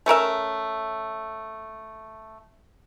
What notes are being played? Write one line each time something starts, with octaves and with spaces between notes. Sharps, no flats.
A3 C#4 A#4 E5